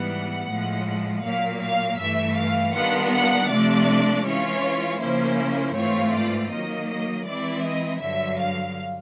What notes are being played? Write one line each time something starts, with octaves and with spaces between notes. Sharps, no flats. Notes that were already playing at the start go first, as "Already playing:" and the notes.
Already playing: G#2 E3 G3 B3 F#5
A2 F3 G#3
A#2 F#3 A#3 F5
F5
G2 E3 A3 E5
F5
D#3 G3 B3 D4 F4 F#5
F#5
C3 F3 A3 D4 D5
E3 G#3 C#4 F4 C#5
C#3 F3 A#3 C#4 E4 C5
G#2 E3 A3 C4 F4 C#5
D5
D#3 F#3 A#3 D#5
D#5
E3 G#3 C4 E4 D5
D#5
G2 D3 F#3 E5
F5